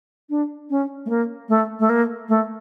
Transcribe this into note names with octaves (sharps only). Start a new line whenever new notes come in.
D4
C#4
A3
A#3
A3
A3
A#3
A3